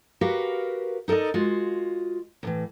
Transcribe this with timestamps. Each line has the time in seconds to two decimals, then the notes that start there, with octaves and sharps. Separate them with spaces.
0.21 F#4 G4 A#4 B4 F5 F#5
1.08 D#4 A4 A#4 D5 D#5
1.34 G#3 F4 F#4
2.43 D#2 A2 E3